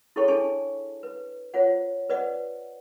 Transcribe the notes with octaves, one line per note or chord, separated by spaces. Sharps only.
E4 G#4 A4 C#5 G5 C#6
D4 A4 G#5 A5 C#6
B4
F4 C5 C#5 F#5
B4 C5 D5 D#5 F#5